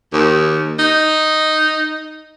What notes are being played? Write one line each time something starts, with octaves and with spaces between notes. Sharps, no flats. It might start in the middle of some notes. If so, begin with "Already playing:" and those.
D#2
D#4